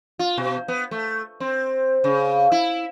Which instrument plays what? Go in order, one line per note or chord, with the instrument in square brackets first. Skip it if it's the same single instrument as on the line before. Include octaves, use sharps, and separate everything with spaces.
[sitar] F4
B2
B3
A3
C4
C#3
E4